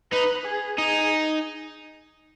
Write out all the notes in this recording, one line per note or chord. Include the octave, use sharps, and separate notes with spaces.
D#4 B4
G#4
D#4 G#4